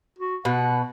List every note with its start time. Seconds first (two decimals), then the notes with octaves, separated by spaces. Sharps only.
0.19 F#4
0.45 B2 F#5